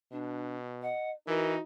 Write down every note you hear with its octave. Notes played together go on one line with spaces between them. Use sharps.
B2 D4
D#5 F#5
E3 D#4 F#4 A#4